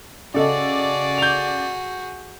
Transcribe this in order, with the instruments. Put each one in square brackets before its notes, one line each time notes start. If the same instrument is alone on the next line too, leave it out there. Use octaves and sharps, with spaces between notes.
[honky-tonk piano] C#3 A4 D#5 [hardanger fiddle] F#4 G#4 [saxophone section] D5
[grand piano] G6 F7